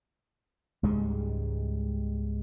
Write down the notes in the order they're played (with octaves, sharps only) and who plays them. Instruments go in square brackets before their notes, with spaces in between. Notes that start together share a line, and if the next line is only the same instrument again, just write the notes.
[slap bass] C#2 G#2 G3 G#3